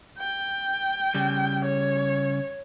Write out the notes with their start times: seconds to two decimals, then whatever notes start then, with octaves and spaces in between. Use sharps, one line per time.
0.19 G5
1.15 C#3 G3
1.65 C#5